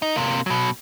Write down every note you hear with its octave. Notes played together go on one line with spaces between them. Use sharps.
D#4
C3 A#3
B2 F#3